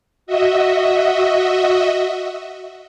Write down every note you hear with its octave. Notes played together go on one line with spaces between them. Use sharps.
F#4 D#5 E5